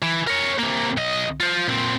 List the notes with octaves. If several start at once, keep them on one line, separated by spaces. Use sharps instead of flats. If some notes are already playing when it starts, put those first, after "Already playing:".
E3
A#4 C#5
C3 A#3
B1 D#5
F4 C5
A#2 C4